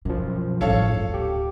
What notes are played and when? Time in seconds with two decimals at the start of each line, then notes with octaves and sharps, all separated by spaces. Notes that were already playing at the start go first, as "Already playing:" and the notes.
0.05 F#2 B2 F3
0.61 A1 G2 A4 C#5 F5
0.94 D1
1.14 G4